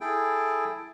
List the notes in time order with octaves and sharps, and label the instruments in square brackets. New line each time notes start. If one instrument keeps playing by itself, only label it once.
[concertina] E4 G#4 A4 G5